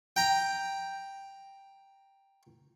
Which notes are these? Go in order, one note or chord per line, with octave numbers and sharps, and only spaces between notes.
G5 A#5